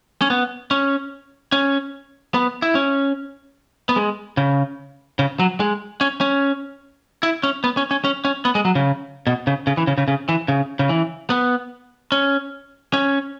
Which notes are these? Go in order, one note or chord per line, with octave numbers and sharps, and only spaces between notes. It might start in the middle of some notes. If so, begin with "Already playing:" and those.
C#4
B3
C#4
C#4
B3
E4
C#4
B3
G#3
C#3
C#3
F#3
G#3
C#4
C#4
E4
C#4
B3
C#4
C#4
C#4
C#4
B3
G#3
F#3
C#3
B2
C#3
C#3
E3
C#3
C#3
C#3
E3
C#3
C#3
E3
B3
C#4
C#4